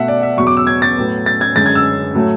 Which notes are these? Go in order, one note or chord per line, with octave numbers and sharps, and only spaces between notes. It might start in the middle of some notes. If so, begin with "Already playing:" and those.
Already playing: B2 A3 E5 F#5
D5
E5
E2 B2 F#3 C#6
D6
E6
G#6
A6
A2 F#3 B3
A6
G#6
F#2 D3 G#3 A6
G#6
E6
A2 F#3 A3